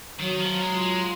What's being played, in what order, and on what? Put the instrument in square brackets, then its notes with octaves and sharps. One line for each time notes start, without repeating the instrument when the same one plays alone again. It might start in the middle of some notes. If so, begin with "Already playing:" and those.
[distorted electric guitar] D#3 [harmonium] F#3
[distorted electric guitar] F3
[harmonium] F#3
[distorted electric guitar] G#3
[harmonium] F4
[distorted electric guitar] G#3